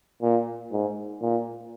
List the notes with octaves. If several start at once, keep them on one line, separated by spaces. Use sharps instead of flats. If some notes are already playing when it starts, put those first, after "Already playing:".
A#2
G#2
A#2